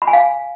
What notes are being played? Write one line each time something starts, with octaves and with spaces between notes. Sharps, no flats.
B5
G#5
F5